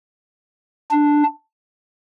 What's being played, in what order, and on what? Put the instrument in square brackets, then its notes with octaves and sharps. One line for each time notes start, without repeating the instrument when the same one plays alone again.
[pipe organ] D4